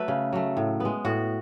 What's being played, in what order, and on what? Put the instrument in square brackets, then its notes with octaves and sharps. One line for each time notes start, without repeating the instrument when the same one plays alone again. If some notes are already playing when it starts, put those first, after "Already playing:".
Already playing: [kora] F#3 A3 B4
C#3
F#3 A3
A2
G#3 B3
A2 F#4